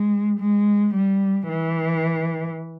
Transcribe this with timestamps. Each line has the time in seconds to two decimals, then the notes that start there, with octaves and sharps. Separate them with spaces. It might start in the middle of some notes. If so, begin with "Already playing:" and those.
Already playing: G#3
0.39 G#3
0.94 G3
1.49 E3